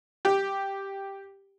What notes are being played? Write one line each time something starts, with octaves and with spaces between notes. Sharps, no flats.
G4